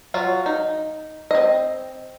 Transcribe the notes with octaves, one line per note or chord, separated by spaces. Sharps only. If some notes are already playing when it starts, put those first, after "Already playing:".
F#3 F4 F#4
D#4
C4 D#5